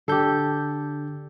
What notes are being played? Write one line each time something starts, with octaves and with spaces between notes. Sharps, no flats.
D3 D4 G4 A4 G6